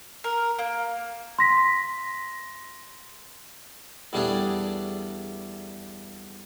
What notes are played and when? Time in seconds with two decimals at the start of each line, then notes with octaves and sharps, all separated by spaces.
0.24 A#4
0.59 A#3
1.39 C6 A#6 B6
4.13 E2 G3 A3 D4 G#4